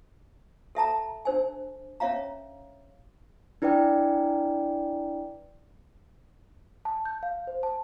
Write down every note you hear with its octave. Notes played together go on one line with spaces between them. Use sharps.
A4 E5 A5 A#5
D4 C5 G#5
C#4 C#5 E5 F5 A#5
D4 E4 B4 D5 G5
A5
G6
F5
C5
A5